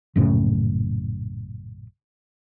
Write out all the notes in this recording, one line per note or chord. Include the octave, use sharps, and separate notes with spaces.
A#1 F#2 A2 C#3